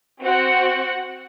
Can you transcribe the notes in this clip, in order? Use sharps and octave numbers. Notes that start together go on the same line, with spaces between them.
C4 F#4 F#5